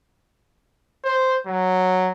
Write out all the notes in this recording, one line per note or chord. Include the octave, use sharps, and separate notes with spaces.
C5
F#3